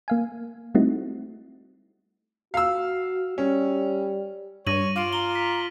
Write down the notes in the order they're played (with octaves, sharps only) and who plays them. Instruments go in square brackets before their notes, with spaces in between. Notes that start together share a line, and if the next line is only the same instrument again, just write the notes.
[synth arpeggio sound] A#3 F5 G#5
G3 A3 C4 D#4 E4 F#4
[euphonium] F#4 [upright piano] F5 E6
[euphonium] G3 [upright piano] C#4
[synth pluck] G2 [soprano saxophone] C#5 [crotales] A#6 D#7 F#7
[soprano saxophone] F4 [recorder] F5 [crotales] D6 F6 D7
[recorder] A#5 [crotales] G7
[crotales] B6